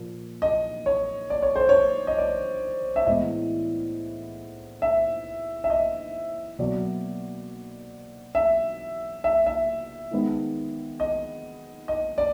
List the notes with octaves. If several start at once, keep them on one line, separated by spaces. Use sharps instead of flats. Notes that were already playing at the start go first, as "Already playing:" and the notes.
Already playing: A#2 F3 A#3
D#5
C#5
D5
C#5
C5
C#5
D#5
D5
E5
A2 E3 G#3 B3 D#5
E5
E5
D#5
B2 F#3 A#3 D5
E5
E5
E5
D#3 G#3 B3
D#5
D#5
D5